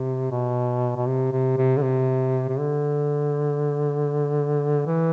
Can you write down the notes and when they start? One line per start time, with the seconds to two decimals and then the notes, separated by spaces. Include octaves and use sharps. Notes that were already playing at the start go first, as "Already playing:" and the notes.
Already playing: C3
0.31 B2
0.96 B2
1.07 C3
1.32 C3
1.57 C3
1.77 D3
1.83 C3
2.49 C3
2.59 D3
4.86 E3